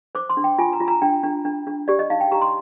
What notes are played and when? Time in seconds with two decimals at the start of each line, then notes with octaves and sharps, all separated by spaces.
0.15 C5 D6
0.30 C6
0.37 D4
0.44 G5
0.58 F4 G#5
0.73 A#5
0.80 F4
0.88 A#5
1.02 D4 G5
1.23 D4
1.45 D4
1.67 D4
1.88 G4 D5
1.99 D#5
2.10 D#4 F5
2.21 G5
2.32 G4 A#5
2.41 C6